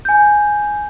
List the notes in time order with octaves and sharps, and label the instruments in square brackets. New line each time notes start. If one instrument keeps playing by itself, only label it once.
[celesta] G#5 G6